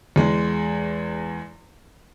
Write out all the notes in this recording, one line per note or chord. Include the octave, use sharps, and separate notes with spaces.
E2 G#3